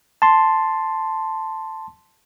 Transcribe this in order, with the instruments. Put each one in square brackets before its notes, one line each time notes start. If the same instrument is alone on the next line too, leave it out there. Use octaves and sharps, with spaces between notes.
[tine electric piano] A5 C6